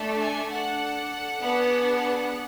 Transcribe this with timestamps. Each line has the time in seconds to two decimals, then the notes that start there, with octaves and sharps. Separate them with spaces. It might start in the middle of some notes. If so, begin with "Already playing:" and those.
Already playing: A3 D4 A4
0.18 G#5
0.49 D4 A4 F#5
1.41 B3 D4 G#4